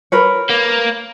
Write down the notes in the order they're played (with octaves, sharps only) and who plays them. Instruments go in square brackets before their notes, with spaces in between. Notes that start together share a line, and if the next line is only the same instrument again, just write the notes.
[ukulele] A#4 B4 C#5
[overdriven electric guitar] A#3